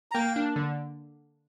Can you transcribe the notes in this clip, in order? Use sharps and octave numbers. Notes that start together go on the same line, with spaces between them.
A#5
A#3 G5
D4
D3